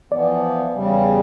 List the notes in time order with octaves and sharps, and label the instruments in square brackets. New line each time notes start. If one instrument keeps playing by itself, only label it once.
[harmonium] E3 F3 B3 [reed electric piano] D5
[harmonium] E2 C#3 G3